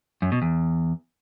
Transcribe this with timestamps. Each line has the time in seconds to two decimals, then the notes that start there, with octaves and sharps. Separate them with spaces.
0.22 F#2
0.32 B2
0.42 E2